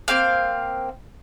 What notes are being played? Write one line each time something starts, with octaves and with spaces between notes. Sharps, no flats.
A#3 C4 F5